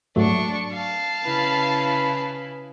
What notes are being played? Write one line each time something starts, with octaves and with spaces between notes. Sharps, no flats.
G#2 F#3 A3 D4 C#6
F5 A5
C#3 E4 B4